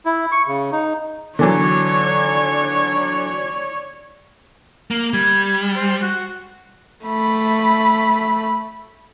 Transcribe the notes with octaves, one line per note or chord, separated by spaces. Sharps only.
E4
C#6
C#3
D#4
D3 E3 F#3 C#5 D5
A#3
G3 G#6
C5
F#4
A3 B5